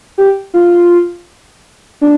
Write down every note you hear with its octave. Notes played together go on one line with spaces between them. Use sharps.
G4
F4
D4